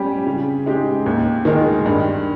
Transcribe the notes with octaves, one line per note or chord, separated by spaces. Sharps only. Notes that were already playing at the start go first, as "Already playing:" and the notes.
Already playing: G3 C#4 G4
C#3
G#3 D#4 G4
D#2
D#3 G#3 D#4 A#4
G2